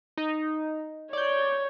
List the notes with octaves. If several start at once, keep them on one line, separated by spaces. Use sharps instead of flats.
D#4
C#5 D5 G6